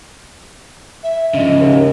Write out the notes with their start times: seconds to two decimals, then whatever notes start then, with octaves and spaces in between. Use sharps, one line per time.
1.03 E5
1.34 C#3 F3 D#5
1.60 D#2